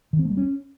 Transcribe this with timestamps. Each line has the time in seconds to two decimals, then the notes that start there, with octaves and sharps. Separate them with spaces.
0.13 D#3
0.19 C4
0.25 A3
0.31 G3
0.37 C#4